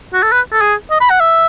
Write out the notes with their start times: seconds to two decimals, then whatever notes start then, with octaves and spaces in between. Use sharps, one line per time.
0.13 F#4
0.23 A4
0.32 B4
0.52 A4
0.61 G#4
0.91 D#5
1.01 B5
1.10 F#5
1.20 E5